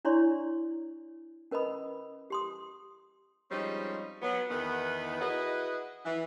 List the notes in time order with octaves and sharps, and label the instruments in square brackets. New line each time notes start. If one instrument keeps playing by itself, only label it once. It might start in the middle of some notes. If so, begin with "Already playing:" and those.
[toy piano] D4 E4 C#5 D5 C6 C#6
C#4 A#4 B4 D#5 B5 D#6
G4 C6 D#6
[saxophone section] F3 G3 G#3 C4 C#4 D#4
F#3 B3
E2 D#3 B3
E4 F#4 G#4 B4 D#5
E3